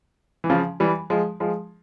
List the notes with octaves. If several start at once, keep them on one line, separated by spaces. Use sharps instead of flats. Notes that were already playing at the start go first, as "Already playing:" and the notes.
E3
C#3 F3
E3 G3
F3 G#3
F3 G#3